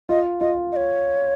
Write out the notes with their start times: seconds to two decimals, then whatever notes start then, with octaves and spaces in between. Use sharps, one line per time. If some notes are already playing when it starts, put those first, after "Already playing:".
0.09 F4 D#5
0.40 F4 D#5
0.72 D#5
0.76 C#5